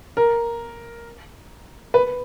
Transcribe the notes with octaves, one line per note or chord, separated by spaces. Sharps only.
A#4
B4